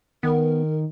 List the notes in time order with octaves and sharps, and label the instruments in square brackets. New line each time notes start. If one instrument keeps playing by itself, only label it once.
[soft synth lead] D#3 [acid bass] B3 [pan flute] A#4